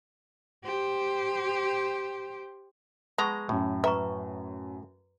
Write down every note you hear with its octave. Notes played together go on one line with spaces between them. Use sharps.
G4 C5
G#3 B3 A5 A#5 C#6
F#2 A2 F#4
B4 E5 A#5 C#6